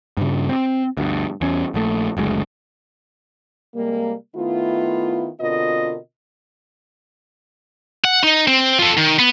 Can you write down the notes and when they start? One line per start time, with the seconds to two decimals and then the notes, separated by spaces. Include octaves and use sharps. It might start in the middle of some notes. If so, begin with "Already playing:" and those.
0.17 G2 C#3
0.49 C4
0.97 D2 G2
1.41 E2 C#4
1.74 A#1 A3
2.17 F#1 D2 G#3
3.74 C3 G3 G#3 A#3
4.36 D#3 A3 B3 E4 F4
5.40 B2 D3 C4 F4 A#4 D#5
8.05 F#5
8.24 D#4
8.48 C4
8.79 F4 A4
8.97 D#3
9.19 B3